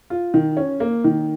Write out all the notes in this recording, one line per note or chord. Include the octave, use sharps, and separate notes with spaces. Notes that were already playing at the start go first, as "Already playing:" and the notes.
F4
D#3
C#4
A#3
D#3